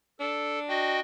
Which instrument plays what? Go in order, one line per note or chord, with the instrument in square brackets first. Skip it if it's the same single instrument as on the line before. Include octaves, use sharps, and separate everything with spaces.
[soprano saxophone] D4 [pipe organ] A4
[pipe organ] F#4 D#5 G5